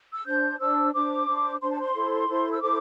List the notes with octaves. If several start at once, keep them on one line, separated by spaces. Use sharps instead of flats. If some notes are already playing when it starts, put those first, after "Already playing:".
E6
D4 C5 G6
D4 C5 E6
D4 C5 D6
D4 C5
D4 C5 C6
A5
C6
E4 A4 C5
E4 A4 C5
E6
E4 A4 C5 D6